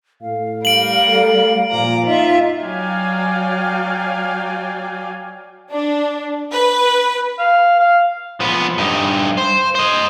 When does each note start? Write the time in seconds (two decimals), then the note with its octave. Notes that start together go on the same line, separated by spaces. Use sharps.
0.22 A2 F5
0.65 G3 A#4 D7 F#7
1.07 A3
1.71 A#2 F3 A#5 D6
2.06 D#4 F4 E5
2.61 F#3 D5 F5 G5 G#5
5.71 D4
6.51 B4
7.39 F5
7.80 F5
8.40 F3 B3
8.78 G2 D#4
9.37 C5
9.75 C5 D#5